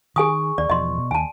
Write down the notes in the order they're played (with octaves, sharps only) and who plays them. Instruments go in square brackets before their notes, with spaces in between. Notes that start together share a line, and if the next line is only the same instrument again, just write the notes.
[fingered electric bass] D#3 [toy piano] G#4 G#5 D#6 [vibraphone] C#6
[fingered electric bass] D#2 [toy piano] D5
[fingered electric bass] E1 E2 F3 [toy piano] D#5 C6
[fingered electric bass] B2
[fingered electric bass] D#2 [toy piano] G#5 A5